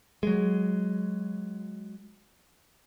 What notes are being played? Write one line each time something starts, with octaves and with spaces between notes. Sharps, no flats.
F#3 G#3